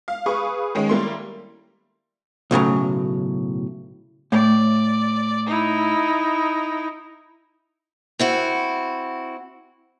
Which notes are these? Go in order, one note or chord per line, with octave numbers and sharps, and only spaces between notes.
F5
G#4 B4 F5 C#6
D#3 G#3 C#4
G3 A#3 E4 C6
B1 A2 C#3 F#3
A2 D5
D#4 E4
C4 E4 F#4